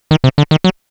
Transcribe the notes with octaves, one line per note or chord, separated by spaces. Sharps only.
D#3
C3
D3
D#3
F#3